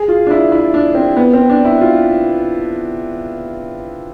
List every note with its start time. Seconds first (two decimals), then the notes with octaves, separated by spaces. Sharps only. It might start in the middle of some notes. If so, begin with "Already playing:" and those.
Already playing: G#4
0.08 F4
0.27 D4
0.31 E4
0.52 E4
0.74 D4
0.94 C4
1.16 B3
1.33 C4
1.50 D4
1.65 E4
1.81 F4